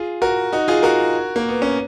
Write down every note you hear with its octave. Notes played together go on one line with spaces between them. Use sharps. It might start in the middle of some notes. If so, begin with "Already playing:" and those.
Already playing: F4 G#4
F#4 A#4
D#4 F#4
F4 G#4
F#4 A#4
A#3
B3
C#4